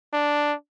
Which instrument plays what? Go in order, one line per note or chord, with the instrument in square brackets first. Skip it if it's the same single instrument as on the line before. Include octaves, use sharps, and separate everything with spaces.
[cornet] D4